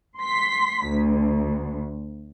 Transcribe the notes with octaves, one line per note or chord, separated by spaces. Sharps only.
C6 B6
D2